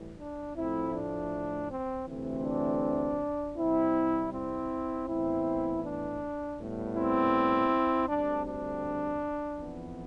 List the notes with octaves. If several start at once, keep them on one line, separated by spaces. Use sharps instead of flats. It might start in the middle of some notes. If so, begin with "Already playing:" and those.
Already playing: A2 E3 G3
D4
A2 F3 A3 C4 E4
D4
C4
D2 C3 E3 A3 C4
D4
C2 C3 G3 C4 E4
C4 E4
A2 E3 B3 C4 E4
D4
A2 G3 B3
C4 E4
D2 D3 G3 C4 D4
D4
F2 E3 B3